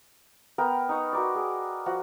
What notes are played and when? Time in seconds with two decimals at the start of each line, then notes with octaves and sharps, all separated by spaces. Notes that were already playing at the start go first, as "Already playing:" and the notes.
0.58 B3 A#4 G5
0.89 D#4 C#6 D#6
1.13 F#4 A#4 D5
1.35 G#4
1.86 F3 F#4